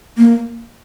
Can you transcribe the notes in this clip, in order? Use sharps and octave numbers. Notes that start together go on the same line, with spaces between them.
A#3